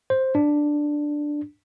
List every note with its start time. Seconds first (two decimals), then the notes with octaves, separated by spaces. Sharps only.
0.10 C5
0.35 D4